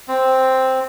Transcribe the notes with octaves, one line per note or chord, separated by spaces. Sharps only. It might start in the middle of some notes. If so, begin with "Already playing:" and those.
C4